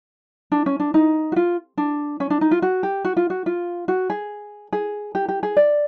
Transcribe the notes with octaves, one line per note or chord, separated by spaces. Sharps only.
D4
C#4
D4
D#4
F#4
F4
D4
C#4
D4
D#4
F4
F#4
G4
F#4
F4
F#4
F4
F#4
G#4
G#4
G4
G4
G#4
D5